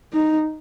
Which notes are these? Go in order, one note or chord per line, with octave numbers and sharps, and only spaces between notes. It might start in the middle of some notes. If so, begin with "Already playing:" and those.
D#4